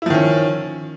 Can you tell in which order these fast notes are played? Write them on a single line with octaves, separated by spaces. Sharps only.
E4 F3 D#3 C#4